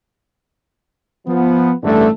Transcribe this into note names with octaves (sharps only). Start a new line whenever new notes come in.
F3 B3
A1 G2 D3 A3